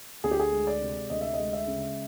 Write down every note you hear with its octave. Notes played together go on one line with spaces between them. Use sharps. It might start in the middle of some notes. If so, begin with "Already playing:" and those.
D2 G#4
G4
G#4
G#3
D5
C3
D2 D#5
E5
D#5
G#3
E5
C#3